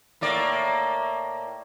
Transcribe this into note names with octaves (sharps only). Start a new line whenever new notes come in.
A2 A#3 D5